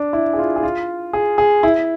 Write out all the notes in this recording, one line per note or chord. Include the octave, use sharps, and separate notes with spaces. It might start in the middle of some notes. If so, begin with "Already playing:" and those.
Already playing: D4
E4
G#4
F4
G#4
F4
G#4
G#4
E4